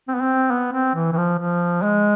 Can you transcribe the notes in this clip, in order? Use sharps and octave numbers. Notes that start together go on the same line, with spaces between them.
C4
B3
C4
B3
C4
E3
E3
F3
F3
G#3